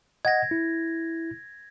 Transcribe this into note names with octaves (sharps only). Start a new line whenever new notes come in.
D#5 F#5 G#6 A#6
E4